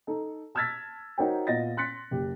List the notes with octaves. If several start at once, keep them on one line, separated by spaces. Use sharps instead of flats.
D#4 A4
A5 E6 F6 G#6 A6 B6
D#4 F#4 A#4 C5 C#5 G5
A#2 B3 D#5 A6 A#6
C6 F#6 A6 B6 C#7
F#1 G4